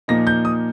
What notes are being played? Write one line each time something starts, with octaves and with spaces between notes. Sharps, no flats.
A#2 F3 A#3 D#4 A#6
G6
D#6